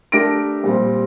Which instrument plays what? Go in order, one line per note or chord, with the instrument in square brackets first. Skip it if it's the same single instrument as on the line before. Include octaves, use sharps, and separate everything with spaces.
[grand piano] A3 D4 G4 A#4 A#6 D7
A#2 G3 C4